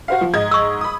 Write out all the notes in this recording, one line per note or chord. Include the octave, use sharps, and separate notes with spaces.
F#4 C5 F5
F3
G#2 D#5 G#6
C#6 E6
B5 D#6